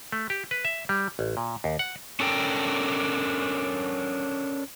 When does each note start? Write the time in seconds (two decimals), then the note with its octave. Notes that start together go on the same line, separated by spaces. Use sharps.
0.12 A3
0.30 G4
0.51 B4
0.65 E5
0.89 G3
1.19 A1
1.37 A#2
1.64 D#2
1.79 F#5
2.20 C#4 D4 A4 A#4 G5